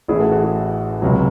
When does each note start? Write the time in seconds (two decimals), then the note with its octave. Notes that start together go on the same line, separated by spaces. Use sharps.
0.08 A1 A2 E3 E4 G#4
0.20 F#4 A4
0.31 F#4 A4
0.43 E4 G#4
1.02 C#2 C3 F#3